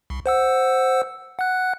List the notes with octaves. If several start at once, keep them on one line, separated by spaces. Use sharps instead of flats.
C2
C5 F#5 E6
F#5 F#6